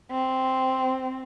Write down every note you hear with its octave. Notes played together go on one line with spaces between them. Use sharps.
C4